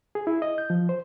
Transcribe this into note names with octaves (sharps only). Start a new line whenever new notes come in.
G#4
E4
D#5
G6
F3
C5